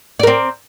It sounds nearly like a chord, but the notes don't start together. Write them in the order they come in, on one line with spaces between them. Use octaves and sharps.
D5 A#4 C4